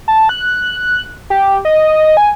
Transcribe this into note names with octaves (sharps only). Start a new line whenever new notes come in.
A5
F#6
G4
D#5
G#5